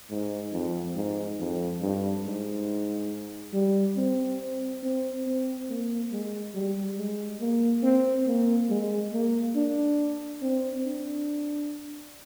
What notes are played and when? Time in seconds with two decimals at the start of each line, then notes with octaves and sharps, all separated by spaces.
0.10 G#2
0.53 F2
0.96 G#2
1.39 F2
1.82 G2
2.26 G#2
3.54 G3
3.97 C4
4.83 C4
5.26 C4
5.69 A#3
6.12 G#3
6.55 G3
6.98 G#3
7.41 A#3
7.84 C4
8.27 A#3
8.70 G#3
9.13 A#3
9.56 D4
10.42 C4
10.85 D4